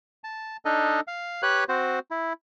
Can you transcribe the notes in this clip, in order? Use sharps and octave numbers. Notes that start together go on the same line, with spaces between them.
A5
D4 D#4 A4 D#5
F5
G4 B4 C#5 B5 F#6
C4 F#4 C5
E4